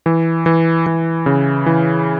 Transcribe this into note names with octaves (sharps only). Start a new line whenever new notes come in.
E3
E3
E3
C#3
E3